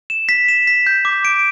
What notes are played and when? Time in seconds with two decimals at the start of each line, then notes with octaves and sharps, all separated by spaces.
0.10 E7
0.29 B6
0.48 E7
0.67 B6
0.87 G6
1.05 D6
1.25 D7